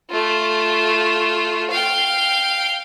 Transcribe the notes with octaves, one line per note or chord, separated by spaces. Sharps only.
A3 F4
F5 G5